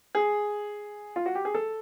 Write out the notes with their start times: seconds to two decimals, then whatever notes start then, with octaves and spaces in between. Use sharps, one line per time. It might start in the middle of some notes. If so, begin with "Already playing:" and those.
0.15 G#4
1.16 F4
1.26 F#4
1.35 G4
1.45 G#4
1.54 A4